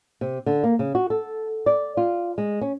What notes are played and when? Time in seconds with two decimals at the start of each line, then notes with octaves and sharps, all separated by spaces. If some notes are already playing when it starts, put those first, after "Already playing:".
0.21 C3
0.46 D3
0.64 A#3
0.79 C#3
0.95 F#4
1.10 A4
1.66 D5
1.97 F4
2.38 G#3
2.61 C#4